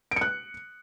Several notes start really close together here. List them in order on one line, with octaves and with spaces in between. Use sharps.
D7 C#7 F#6